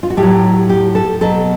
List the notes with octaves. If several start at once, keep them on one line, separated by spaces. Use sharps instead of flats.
F4
F#4
A2 G4
F#3
G4
A4
B2 F#3 A4